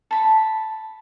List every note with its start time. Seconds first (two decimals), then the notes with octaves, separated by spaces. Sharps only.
0.11 A5 B5